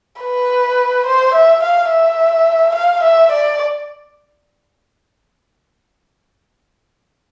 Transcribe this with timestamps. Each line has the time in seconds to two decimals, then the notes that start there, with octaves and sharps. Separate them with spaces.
0.22 B4
1.06 C5
1.34 E5
1.63 F5
1.90 E5
2.75 F5
3.03 E5
3.32 D5